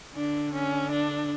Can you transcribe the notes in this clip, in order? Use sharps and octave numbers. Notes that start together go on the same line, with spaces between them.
D3 D4
C#4
D4